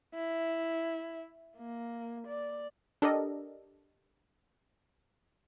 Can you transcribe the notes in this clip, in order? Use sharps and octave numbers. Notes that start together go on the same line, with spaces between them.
E4
A#3
D5
D4 G4 A4 A#4 D5 D#5